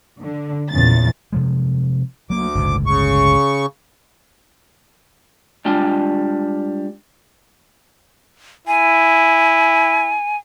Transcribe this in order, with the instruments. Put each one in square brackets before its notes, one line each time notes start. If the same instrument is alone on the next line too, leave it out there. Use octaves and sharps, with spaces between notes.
[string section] D3
A#1 E2 C#3 A6
[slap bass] C3 F3 G#3
[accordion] D2 D6 [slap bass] F#3 A#3
[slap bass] G1 C#2 A2
[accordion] C#3 C#6
[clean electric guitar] G3 G#3 D4 F4 G5
[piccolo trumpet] E4 [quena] G#5